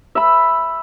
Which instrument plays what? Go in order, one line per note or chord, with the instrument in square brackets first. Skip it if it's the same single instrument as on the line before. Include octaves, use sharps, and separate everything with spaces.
[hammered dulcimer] E5 B5